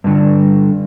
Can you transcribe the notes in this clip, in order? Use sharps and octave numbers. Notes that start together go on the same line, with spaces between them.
G2 D3